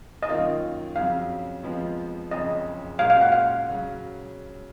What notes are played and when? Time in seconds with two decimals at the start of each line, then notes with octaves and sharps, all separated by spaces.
0.23 D#5
0.29 F#2 D#3 A#3 F4 F5
0.96 F2 C#3 F#3 F5
1.63 F2 F3 G#3 B3 F4
2.31 F#1 F2 C#3 D#5
2.98 A#2 G#3 C#4 F#4 F5
3.10 F5
3.21 F#5
3.32 F5
3.69 C#3 F#3